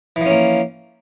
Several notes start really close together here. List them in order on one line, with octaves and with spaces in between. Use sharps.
E3 F3 C#4 A#3